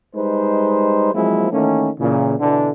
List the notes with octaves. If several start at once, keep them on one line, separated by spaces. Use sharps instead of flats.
G3 G#3 D#4 B4 C5
F3 F#3 G#3 A#3 C4 E4
D#3 E3 A3 A#3 C#4
A#2 C#3 E3
B2 D3 E3